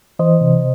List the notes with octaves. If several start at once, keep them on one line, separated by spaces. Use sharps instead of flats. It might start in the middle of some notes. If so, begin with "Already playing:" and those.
E3 C5 D#5
C3